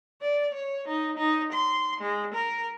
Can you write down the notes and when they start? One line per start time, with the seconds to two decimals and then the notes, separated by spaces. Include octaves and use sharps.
0.22 D5
0.55 C#5
0.88 D#4
1.18 D#4
1.53 C6
2.01 G#3
2.34 A#4